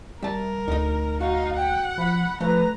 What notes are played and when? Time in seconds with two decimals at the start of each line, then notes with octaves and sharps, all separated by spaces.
0.23 G3 A#4 E5 A5
0.68 D2 D#4 D#5
1.20 D#4 F#4 F5
1.57 F#5 G5
1.98 F3 B5
2.41 F3 A3 B4 A#5